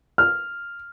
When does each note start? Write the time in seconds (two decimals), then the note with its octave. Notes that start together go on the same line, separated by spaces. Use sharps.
0.18 F6